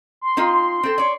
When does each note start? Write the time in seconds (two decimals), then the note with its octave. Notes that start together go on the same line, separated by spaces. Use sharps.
0.21 C6
0.37 C4 D#4 F4
0.83 C4 A4
0.98 C#5 D5